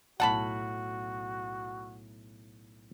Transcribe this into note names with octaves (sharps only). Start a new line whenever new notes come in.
B1 A2 F#4 F#5 A5 B5